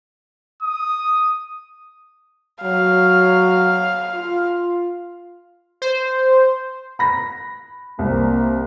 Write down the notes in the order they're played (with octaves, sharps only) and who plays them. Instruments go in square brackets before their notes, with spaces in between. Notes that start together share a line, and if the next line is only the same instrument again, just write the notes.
[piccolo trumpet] D#6
[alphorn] F#3 [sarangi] F5
[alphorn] F4
[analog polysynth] C5
[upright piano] B5 A#6
[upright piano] C2 [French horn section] A#3 C4